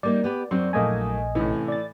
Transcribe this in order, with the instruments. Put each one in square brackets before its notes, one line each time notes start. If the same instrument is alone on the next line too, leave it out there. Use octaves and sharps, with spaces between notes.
[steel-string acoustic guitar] G3 A#3 D#4 [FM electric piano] D5
[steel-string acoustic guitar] B3 G4 B4
[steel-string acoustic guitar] F#2 F#3 [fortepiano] C4
[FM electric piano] A#1 D#5 G#5 [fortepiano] A3 A#3 D#4
[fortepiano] A2 E3 [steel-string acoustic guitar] C3 C#4
[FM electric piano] D5 A6